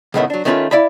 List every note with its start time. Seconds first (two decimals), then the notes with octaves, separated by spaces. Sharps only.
0.14 C#2 F#2 A2 D#3 A3 B3
0.30 F#3 D4
0.45 D#3 A3 C#4 D#4 F4 B4
0.71 E4 D5 F5 B5